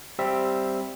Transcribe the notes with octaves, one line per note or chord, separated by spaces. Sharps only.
G3 C4 E5